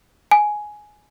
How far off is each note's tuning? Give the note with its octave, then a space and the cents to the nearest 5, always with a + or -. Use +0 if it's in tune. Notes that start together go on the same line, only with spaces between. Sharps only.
G#5 +10